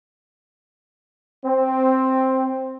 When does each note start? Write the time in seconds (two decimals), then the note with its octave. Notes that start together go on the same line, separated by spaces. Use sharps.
1.45 C4